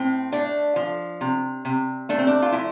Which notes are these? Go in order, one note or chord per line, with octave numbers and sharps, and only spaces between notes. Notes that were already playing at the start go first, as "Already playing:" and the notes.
Already playing: A2 C4
A3 D4
F3
C3
C3
A3 D4
C4
D4
F4
F3 E4